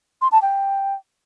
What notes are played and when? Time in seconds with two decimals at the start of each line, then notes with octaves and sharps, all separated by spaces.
0.21 C6
0.32 A5
0.42 G5